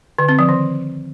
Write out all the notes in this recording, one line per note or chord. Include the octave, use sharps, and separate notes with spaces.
D3
C4
F3
D#3